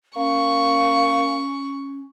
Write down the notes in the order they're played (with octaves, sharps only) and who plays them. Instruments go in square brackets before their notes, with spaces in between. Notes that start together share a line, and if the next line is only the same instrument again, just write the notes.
[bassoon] A#3 [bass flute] C#4 [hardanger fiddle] C#6